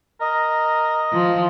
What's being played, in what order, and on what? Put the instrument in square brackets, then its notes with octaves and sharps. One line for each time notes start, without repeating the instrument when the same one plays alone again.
[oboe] A#4 [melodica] D#5
[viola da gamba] F3